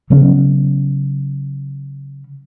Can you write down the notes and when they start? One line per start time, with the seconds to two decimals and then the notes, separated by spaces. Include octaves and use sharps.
0.10 C#3 F#3 B3 C#4